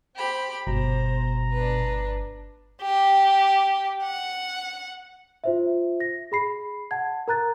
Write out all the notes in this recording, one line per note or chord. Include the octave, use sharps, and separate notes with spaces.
G4 C5 B5
G1 B2 C5 A#5
D4 B4
G4
F#5
F4 C5 E5
A#6
G#4 B5 C7
F#5 A5 G#6
A#4 A#5 F#6 A6